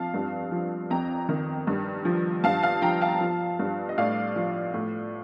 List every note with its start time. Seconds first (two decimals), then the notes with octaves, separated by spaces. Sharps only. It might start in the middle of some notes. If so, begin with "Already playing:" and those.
Already playing: F2 F3 F5 A5
0.14 G2
0.52 F3
0.90 F2 G5 A#5
1.29 D#3
1.67 G2
2.05 F3
2.44 G2 F5 A5
2.63 F5 A5
2.82 F3 G5 A#5
3.01 F5 A5
3.21 F3
3.59 G2
3.89 D#5
3.97 A2 D5 F5
4.36 F3
4.74 A2